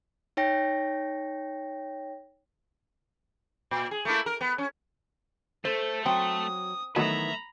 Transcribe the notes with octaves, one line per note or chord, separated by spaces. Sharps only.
D#4 C#5 G5 A#6
A#2
G#4
A3 A#3 E4
A#4
B3
C#4
A3 A4 C5
F#3 C4 D#6
D#3 E3 F#3 A3 B3 E5 A#5 B5